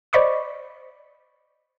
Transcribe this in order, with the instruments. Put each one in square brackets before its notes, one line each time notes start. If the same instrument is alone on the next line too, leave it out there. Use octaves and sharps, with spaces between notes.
[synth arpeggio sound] C5 D5 D#5 B5 C#6 D6